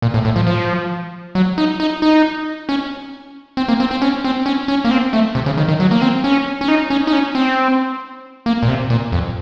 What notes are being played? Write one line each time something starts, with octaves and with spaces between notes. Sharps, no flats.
A#2
A2
A2
F3
F3
F#3
D#4
D#4
D#4
C#4
C4
A#3
C4
C4
C#4
C4
C#4
C#4
A#3
C4
A3
C3
C#3
D#3
D#3
F#3
A#3
C4
C#4
C#4
D#4
C#4
D#4
C#4
C4
A#3
A#2
C3
A#2
F2